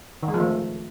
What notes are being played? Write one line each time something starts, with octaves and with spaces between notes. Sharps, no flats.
D#3
G#3
F3
A3